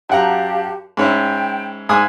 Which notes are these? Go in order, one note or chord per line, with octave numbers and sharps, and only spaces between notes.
F#2 G4 F5 F#5 A5 A#5
G#2 C#4 E4 G5
G#2 G#5 D#6